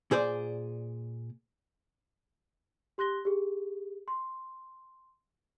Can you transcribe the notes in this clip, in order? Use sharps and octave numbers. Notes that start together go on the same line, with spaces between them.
A#2 G#4 C5 D5
G4 C6 F#6 A#6 G7
G4 G#4
C6